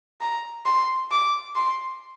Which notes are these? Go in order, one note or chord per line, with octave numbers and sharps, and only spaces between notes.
A#5
C6
D6
C6